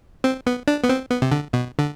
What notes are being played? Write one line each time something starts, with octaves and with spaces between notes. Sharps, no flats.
C4
B3
D4
B3
C4
B3
C3
D3
B2
D3